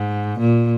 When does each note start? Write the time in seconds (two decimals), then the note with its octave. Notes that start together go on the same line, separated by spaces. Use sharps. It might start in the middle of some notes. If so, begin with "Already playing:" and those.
Already playing: G#2
0.40 A#2